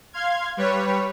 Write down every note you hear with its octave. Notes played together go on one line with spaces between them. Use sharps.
F5 C6 F6 G#6
G3 B4 C#5